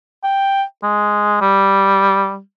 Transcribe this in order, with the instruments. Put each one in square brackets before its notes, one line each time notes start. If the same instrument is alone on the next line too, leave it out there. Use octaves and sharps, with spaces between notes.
[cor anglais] G5
G#3
G3